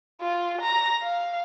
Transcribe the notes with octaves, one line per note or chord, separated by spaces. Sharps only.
F4
A#5
F5